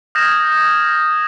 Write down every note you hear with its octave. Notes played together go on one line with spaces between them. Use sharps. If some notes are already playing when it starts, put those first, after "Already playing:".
D#6 F6 G6 G#6 A#6 E7